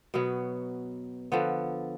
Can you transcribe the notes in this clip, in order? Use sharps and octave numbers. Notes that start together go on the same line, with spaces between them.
B2 F#3 B3
D3 F3 B3